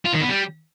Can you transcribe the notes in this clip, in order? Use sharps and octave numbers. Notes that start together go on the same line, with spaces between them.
F4
D#3
B3
G3